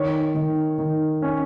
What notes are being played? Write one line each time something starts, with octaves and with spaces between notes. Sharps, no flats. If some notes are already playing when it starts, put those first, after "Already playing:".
Already playing: D#3 C#5
D#3
D#3
C#4